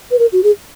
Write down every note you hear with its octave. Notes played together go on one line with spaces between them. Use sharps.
B4
A#4
F#4
G#4